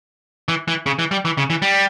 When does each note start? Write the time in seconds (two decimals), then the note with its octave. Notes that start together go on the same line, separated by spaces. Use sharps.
0.49 E3
0.68 E3
0.86 C#3
0.99 E3
1.11 G3
1.25 E3
1.38 C#3
1.50 E3
1.62 G3